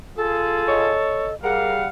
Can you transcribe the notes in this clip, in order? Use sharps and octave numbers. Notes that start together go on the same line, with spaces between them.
F4 G#4 A4
C#5 D#5
G3 G#4 A#4 F5 F#5